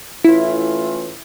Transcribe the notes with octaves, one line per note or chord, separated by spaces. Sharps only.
A2 E3 A3 C#4 E4 F4